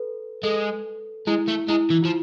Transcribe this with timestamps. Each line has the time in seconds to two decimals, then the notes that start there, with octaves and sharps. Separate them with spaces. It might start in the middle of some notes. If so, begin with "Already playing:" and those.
Already playing: A4 B4
0.43 G#3 A4
1.27 G#3 E4
1.48 A3
1.69 G#3 E4
1.90 E3
2.02 F3 F4